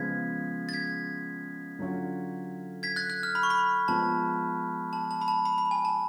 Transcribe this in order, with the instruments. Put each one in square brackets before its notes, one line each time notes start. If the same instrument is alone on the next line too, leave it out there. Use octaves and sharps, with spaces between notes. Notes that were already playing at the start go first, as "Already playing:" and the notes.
Already playing: [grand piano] C#3 F3 G#3 B3 F4 [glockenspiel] G#6 B6
[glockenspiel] A6
G#6 B6
[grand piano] D3 F#3 C#4 F4
[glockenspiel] G#6 B6
F#6 A6
F#6
F6
B5
C#6
B5
[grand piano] F3 G#3 B3 F4 [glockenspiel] A5
[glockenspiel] A5
A5
B5
A5
B5
B5
G#5
A5